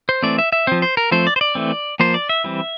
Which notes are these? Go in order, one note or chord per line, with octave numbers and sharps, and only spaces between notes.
C5
E3 A3 C4 D5
E5
E5
F3 C4 C5
C5
A#4
F3 A3 C4 C5
D5
C5
D5
E3 A3 C4
F3 A#3 C5
D5
E5
E3 G3 C4